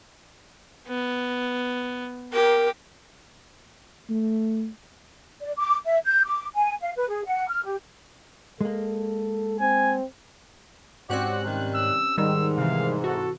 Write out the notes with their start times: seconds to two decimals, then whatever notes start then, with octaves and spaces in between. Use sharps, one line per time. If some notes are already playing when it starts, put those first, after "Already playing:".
0.88 B3
2.33 G4 A#4
4.10 A3
5.41 D5
5.57 D6
5.86 E5
6.05 G6
6.25 D6
6.55 G#5
6.81 F5
6.96 B4
7.09 G#4
7.26 F#5
7.48 F6
7.65 G4
8.61 G#3 A#3 A4
9.60 C4 G#5
11.10 G#2 C4 C#4 F#4 G4 D5 F#6
11.44 C3 D#3 G3
11.75 E6
12.18 G#2 D#3 G3 E6
12.58 C3 E3 F5
13.04 F#4 A4